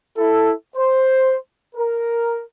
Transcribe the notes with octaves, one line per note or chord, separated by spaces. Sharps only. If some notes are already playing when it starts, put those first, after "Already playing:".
E4 A4
C5
A#4